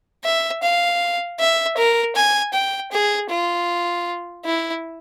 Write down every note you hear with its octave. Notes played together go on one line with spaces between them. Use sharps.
E5
F5
E5
A#4
G#5
G5
G#4
F4
E4